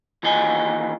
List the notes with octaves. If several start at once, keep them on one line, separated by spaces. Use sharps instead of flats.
D#2 E3 F4 D#5 G#5